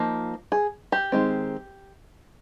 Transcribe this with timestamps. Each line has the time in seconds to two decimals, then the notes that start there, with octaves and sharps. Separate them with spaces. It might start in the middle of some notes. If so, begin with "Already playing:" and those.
Already playing: F3 A#3 D#4
0.52 G#4
0.92 G4
1.12 D#3 G#3 C4